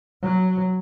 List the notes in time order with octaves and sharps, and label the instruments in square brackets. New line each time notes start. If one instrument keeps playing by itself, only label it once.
[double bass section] F#3